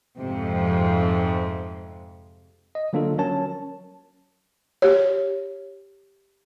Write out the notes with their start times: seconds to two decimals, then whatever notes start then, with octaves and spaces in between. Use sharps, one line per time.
0.18 F2 G#2 C3
2.75 D#5
2.93 D3 F#3 A#3 D4 F4 A4
3.18 F#3 C#4 A#4 C#5 A5
4.82 G4 C#5